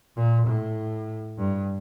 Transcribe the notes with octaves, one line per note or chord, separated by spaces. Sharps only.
A#2
A2
G2